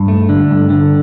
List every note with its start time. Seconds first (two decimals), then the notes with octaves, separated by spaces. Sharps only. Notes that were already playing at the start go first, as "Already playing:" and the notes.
Already playing: G2
0.08 A3
0.29 D3
0.50 G2
0.70 D3